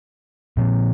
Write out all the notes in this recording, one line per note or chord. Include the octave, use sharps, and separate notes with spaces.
A#2 F3 C4